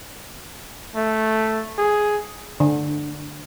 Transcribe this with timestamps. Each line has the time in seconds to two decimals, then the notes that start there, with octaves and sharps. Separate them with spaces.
0.96 A3
1.78 G#4
2.60 D3